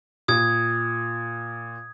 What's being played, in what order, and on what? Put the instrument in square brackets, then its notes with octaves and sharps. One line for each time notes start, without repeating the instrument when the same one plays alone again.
[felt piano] A#2 [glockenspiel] D#6 G#6